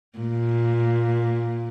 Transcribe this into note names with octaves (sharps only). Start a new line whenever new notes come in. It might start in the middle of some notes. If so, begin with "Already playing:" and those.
A#2